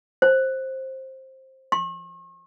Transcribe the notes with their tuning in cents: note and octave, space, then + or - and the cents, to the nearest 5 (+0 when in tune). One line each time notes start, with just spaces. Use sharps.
C5 +15
C#6 -45